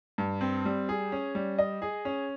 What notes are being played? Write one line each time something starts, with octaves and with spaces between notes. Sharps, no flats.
G2
C4
G3
G#4
C#4
G3
D#5
G#4
C#4